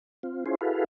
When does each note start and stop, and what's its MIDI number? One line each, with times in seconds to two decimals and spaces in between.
0.23 0.44 60
0.23 0.44 65
0.46 0.55 61
0.46 0.55 64
0.46 0.55 65
0.46 0.55 68
0.46 0.55 72
0.61 0.84 64
0.61 0.84 66
0.61 0.84 68
0.61 0.84 69
0.61 0.84 71
0.61 0.84 77